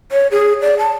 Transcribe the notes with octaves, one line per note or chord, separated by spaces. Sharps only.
C#5
G#4
D5
A5